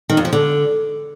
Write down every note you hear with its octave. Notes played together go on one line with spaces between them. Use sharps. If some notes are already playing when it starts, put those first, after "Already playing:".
D#3
F2
F3
D3